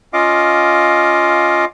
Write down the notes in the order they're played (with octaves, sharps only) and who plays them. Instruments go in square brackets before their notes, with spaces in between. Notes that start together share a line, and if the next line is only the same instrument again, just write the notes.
[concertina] C#4 F4 D#5 F5 D6